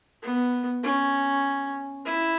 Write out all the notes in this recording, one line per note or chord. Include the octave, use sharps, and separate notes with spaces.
B3
C#4
E4